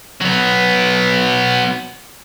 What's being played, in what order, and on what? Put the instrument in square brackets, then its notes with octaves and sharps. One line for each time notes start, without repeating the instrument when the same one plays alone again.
[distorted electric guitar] F#3 B3